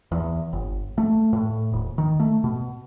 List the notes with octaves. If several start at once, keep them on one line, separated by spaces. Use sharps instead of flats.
E2
G1
A3
A2
D#1
D#3
A3
B2